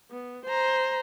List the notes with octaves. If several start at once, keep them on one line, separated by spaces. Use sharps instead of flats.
B3
C5 A#5